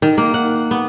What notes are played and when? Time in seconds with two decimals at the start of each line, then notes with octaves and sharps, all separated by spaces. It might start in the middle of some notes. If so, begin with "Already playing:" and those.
0.02 D#3
0.18 A#3
0.34 F#5
0.71 B3